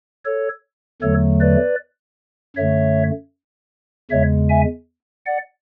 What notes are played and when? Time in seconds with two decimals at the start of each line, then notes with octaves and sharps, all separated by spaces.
0.25 A4 C#5
1.02 E2 D3 F#3 A3 A4 C#5
1.41 B4 D5
2.56 F#2 D3 A3 C#5 E5
4.11 E2 C#3 G#3 C#5 E5
4.49 E5 G#5
5.26 D5 F#5